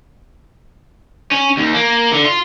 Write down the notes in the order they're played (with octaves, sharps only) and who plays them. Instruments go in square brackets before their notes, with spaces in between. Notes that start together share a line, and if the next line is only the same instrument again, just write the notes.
[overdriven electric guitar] C#4
D#2
A#3
D3
F4